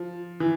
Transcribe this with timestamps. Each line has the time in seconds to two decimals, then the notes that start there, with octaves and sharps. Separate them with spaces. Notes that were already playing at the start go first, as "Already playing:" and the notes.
Already playing: F3
0.40 E3